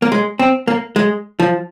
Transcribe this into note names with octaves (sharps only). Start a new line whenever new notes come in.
A#3
G#3
C4
A#3
G#3
F3